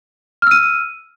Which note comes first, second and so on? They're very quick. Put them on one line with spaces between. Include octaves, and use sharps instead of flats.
F6 E6 D#7